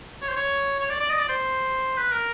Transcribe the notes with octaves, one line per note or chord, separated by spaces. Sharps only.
C#5
C5
C#5
C#5
D5
D5
D#5
D5
C5
B4
A#4